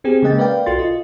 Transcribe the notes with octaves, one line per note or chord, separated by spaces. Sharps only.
B3 C4 G4 G#4
C#3 G#3 A#3 D#5 G5 A6
A#4 B4 D5 F5 G5
B1 F4 F#4 A4 C6 A6
F4 D#5